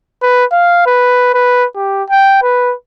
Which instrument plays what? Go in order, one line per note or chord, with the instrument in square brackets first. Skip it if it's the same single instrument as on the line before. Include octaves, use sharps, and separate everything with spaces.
[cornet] B4
F5
B4
B4
G4
G5
B4